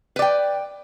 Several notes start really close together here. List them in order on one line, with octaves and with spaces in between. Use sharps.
B4 D5 G5